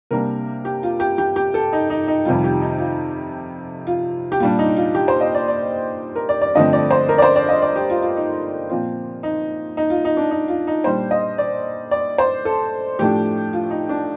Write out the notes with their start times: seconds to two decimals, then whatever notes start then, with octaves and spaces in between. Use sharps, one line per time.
0.11 C3 G3 A#3 D4 A#4
0.65 G4
0.83 F4
1.00 G4
1.18 G4
1.36 G4
1.54 A4
1.73 D#4
1.90 D#4
2.08 D#4
2.25 F2 C3 D#3 G3 F4
2.44 G4
2.61 D#4
2.79 F4
3.87 F4
4.32 G4
4.40 A#2 G3 D4 F4
4.59 D#4
4.77 F4
4.95 G4
5.08 C5
5.21 D#5
5.35 D5
5.48 D5
6.15 A#4
6.29 D5
6.42 D5
6.55 G2 D3 F3 A3 C4 D#5
6.73 D5
6.91 C5
7.09 A#4
7.18 D5
7.22 C5
7.36 D5
7.49 D#5
7.62 D5
7.76 G4
7.90 F4
8.02 F4
8.16 D#4
8.70 A#2 F3 C4 F4
9.23 D#4
9.77 D#4
9.90 F4
10.05 D#4
10.17 D4
10.31 D#4
10.48 F4
10.67 D#4
10.84 A#2 G3 D4 C5
11.11 D#5
11.38 D5
11.91 D5
12.18 C5
12.45 A4
12.99 A2 F3 A3 D4 G4
13.53 F4
13.70 D#4
13.89 D4